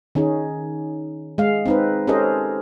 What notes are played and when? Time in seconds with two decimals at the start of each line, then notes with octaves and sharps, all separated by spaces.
0.15 D#3 C#4 D#4 G#4
1.38 G#3 F5
1.66 C4 D#4 B4
2.07 C#4 G4 A4 A#4 C5 D#5